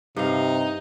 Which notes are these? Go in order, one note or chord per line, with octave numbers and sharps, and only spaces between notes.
G2 C3 D#4 F5